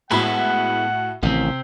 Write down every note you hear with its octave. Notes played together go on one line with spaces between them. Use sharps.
A2 G#3 B3 E4 F#4 F#5 B5
A1 C3 D#3 C4